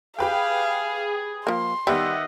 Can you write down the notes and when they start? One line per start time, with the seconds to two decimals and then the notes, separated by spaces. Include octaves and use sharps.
0.19 G4 G#4 B4 F5 G5
1.47 F3 A#3 C6
1.87 D#3 G3 B3 G4 D#5 E5 F#5